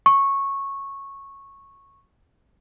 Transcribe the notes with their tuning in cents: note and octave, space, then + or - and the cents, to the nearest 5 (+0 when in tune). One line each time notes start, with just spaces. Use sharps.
C#6 -10